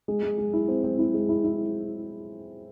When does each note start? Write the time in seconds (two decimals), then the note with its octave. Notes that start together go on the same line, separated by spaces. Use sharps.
0.08 G#3
0.23 G#3
0.38 G#3
0.53 E4
0.68 C4
0.84 C4
0.99 E4
1.14 G#3
1.29 E4
1.44 E4